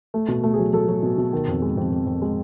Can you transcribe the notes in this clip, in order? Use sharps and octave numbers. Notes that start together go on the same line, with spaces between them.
A3
B2
A3
G#4
F#3
F#3 A4
F#3
B2
B2
D#3
F2
G#3
F2
F2
F2
G#3